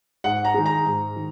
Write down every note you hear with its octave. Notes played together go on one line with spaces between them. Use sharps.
G#2 F#5
A#5
D#3 G#3
A#5
G#2
D#3